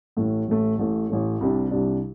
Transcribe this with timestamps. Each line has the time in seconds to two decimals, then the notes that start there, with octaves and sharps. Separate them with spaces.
0.17 A1 A2 A3
0.48 A1 A2 A3
0.78 A1 A2 A3
1.10 A1 A2 A3
1.40 C2 C3 G3 D4
1.71 C2 C3 G3 D4